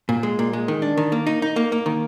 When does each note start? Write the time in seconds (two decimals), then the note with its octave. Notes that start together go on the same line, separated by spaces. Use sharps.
0.09 A#2
0.23 G#3
0.39 A#2
0.53 G#3
0.68 D#3
0.82 D4
0.98 D#3
1.12 A#3
1.27 D#4
1.42 D#4
1.56 A#3
1.72 A#3
1.86 D#3